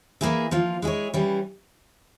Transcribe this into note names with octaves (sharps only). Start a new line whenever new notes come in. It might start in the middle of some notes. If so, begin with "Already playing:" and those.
E3 A#3 E4 G#4 E5
F3 A#3 F4
G#3 E4 G#4 C#5
E3 G3 C#4